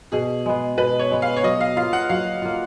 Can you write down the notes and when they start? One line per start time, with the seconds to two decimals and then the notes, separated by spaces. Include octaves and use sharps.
0.12 B2 G#4
0.46 G#3 B3
0.77 B2 B4
0.99 C#5
1.12 G#3 B3
1.22 F5
1.36 C#5
1.43 F#3 D#5
1.61 F5
1.76 A#3 F4 F5
1.93 F#5
2.09 F#3 F5
2.42 A#3 F4